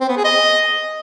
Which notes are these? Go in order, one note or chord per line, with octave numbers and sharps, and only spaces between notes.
C4
B3
G#4
D#5